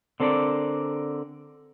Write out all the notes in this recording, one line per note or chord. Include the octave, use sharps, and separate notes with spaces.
D3 C4 A4 A#4 D5